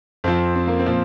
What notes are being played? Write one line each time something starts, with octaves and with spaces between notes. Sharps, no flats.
F2 F3 C4
C4
A#3
C4
A#2 F3